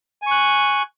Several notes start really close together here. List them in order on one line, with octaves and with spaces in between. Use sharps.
G#5 C#6 F#6